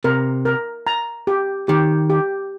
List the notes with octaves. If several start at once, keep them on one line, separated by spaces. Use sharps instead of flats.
C3 A#4
A#4
A#5
G4
D#3 G4
G4